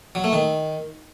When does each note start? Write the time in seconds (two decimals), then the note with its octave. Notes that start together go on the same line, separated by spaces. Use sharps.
0.15 F#3
0.24 A3
0.33 D#3